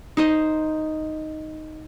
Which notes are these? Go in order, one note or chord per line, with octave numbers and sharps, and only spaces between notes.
D#4 C5 D#5